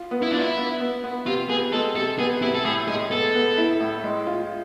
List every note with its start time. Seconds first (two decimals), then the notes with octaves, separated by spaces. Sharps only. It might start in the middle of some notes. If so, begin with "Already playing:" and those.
Already playing: F4
0.11 B3
0.22 E4
0.31 D4 F4
0.41 E4
0.57 B3
0.80 B3
1.04 B3
1.26 C3 F4
1.49 B3 G#4
1.73 G#3 A4
1.95 C3 A4
2.19 B3 G#4
2.42 C3 E4
2.54 A4
2.65 A2 G#4
2.88 G#3 G#4
3.11 B3 A4
3.35 B3
3.57 E4
3.80 A2
4.04 G#3
4.27 F4